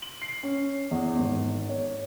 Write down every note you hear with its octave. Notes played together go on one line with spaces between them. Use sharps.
F#7
C7
C#4
E2
G#1
C#5